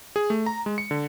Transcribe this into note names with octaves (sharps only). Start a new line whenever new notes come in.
G#4
A3
A#5
G#3
C#7
D3